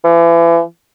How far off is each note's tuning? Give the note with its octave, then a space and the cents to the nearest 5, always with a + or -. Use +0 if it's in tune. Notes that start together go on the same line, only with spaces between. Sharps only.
E3 +35